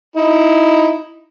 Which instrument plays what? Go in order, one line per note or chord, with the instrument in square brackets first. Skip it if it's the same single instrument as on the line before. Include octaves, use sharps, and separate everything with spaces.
[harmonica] D#4 E4